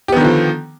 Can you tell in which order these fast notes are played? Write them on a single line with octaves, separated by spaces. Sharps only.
G4 B3 D#3 D3 F3